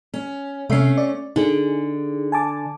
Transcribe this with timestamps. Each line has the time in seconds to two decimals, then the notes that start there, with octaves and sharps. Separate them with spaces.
0.14 C#4
0.70 C3 A3 C#4 E5 C7
0.97 D5
1.36 D3 D#4 G#4
2.32 G#5 A5 D6